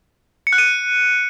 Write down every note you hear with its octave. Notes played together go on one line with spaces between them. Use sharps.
C#7
F#6
D#7